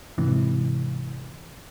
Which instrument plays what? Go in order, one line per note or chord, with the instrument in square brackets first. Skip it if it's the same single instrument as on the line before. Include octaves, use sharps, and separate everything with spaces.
[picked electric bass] G#2 C3 E3